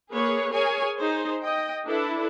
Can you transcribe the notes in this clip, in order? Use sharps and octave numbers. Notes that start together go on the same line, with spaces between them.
A#3 G#4 B4 C#5
G#4 A#4 C#5 G#5
D#4 G#4 C5
D#5 G5
D4 E4 A4 B4